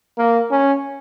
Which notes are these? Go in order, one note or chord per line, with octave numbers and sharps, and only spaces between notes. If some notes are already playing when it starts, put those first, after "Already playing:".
A#3
C#4